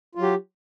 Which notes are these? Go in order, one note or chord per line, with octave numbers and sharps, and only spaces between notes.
F#3 F4 G4